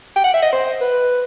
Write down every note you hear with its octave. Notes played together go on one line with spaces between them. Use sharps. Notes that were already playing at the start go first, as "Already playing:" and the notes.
G5
F#5
E5
D#5
C5
B4